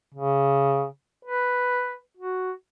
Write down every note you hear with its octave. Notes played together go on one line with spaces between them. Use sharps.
C#3
B4
F#4